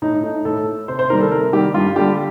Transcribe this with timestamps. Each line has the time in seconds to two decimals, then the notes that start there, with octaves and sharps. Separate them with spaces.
0.02 A2 D#4
0.23 A3 D#4
0.45 A2 A4
0.67 A3
0.88 C3 C5
0.99 C5
1.10 D#3 G3 A#4
1.21 A4
1.31 C3 A#4
1.53 D#3 G3 G4
1.74 G2 F4
1.96 D3 G3 G4